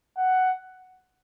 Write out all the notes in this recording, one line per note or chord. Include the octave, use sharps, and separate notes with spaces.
F#5